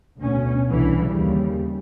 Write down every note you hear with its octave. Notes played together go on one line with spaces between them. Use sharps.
D2 B2 C#4
C2 D3 E3
D#2 C#3 G3